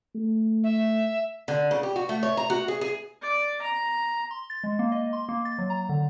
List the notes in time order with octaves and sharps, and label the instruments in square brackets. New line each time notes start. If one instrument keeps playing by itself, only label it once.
[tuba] A3
[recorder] E5
[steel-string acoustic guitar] D3
C#3
G4
F#4
A3
C#5
A#5
F#4
G#4
G#4
[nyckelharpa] D5
A#5
[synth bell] C6
A6
G#3
A#3
D#5
C6
A#3
A6
F#3
A#5
D3